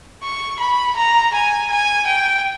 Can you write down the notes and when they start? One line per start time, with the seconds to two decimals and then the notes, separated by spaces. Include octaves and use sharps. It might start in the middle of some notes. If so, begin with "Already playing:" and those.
0.23 C#6
0.60 B5
0.96 A#5
1.34 G#5
1.71 G#5
2.07 G5